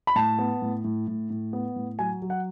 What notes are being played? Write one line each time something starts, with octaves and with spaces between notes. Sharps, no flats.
B5
A2 A5
B3
A2
A2
A2
A2
B3
A2
F#3 G#5
F#3
F#5